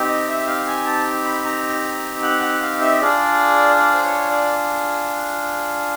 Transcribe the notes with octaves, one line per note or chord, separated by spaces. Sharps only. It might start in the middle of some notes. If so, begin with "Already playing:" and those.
Already playing: C4 D#4 G4
D#5
E5
F5
G#5
A5
B5
A#5
F#5
F#5
F5
E5
D#5
D4 F4 G#4 D5
D5
C5
C#5
D5